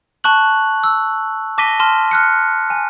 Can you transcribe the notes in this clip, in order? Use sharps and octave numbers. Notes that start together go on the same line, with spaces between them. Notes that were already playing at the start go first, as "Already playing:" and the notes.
A5 C#6 F#6 F#7
E6
A5 D6 A#6 B6 D#7 G7
A5 C6 F6
F6 F#6 C#7
G#5